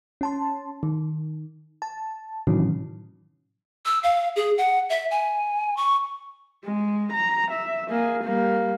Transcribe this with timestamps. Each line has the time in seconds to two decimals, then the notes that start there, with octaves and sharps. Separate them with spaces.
0.21 C#4 A5 C6
0.83 D#3
1.82 A5
2.47 A2 C3 D#3 E3 F#3 C#4
3.86 E6
4.03 F5
4.36 G#4
4.58 F#5
4.90 E5
5.11 G#5
5.77 C#6
6.65 G#3
7.13 A#5
7.52 E5
7.90 A#3 G#4
8.24 G3 A#3